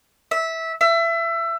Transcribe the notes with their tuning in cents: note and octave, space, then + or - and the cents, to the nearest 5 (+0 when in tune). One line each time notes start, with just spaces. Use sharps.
E5 -15
E5 +25